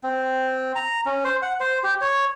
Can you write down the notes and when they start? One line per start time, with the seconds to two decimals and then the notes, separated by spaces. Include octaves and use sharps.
0.03 C4
0.75 A#5
1.06 C#4
1.25 C5
1.42 F#5
1.60 C5
1.83 G4
2.01 C#5